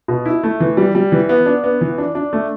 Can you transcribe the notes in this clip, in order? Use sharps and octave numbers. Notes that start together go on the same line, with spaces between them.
B2
E4
A3
E3
G3
G3
E3
B3
D4
B3
E3
D4
D4
A3